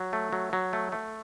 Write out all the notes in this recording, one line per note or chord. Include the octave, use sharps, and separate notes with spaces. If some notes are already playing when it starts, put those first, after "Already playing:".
Already playing: F#3
A3
F#3
F#3
A3
A3